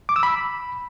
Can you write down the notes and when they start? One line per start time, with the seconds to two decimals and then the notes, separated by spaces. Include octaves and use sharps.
0.09 D6
0.16 E6
0.23 B5